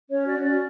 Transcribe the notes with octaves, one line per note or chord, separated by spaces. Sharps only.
C#4 C#5
F#4 D5
C#4 D5